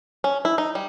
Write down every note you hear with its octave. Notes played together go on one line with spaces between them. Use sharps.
C#4
E4
D#4
G3